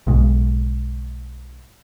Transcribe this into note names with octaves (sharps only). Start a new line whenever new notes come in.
B1 G#2